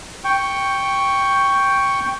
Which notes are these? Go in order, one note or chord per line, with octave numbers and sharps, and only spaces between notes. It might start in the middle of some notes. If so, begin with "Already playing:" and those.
G5 C#6